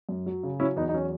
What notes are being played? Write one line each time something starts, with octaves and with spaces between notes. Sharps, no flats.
F#2
F#3
C#3
F#3 C#4 E4
E2 B3 D#4
D#4
F#3 C#4